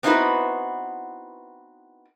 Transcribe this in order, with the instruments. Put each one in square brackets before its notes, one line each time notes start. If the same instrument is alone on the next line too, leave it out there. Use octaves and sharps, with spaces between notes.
[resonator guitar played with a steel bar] B3 C4 D#4 E4 F#4 B4